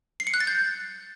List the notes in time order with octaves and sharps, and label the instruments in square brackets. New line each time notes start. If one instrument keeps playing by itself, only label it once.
[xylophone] C7
C#7
F#6
A6
G6